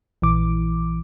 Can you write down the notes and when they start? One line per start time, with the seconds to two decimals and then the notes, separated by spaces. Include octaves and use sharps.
0.22 A#1 E3 D6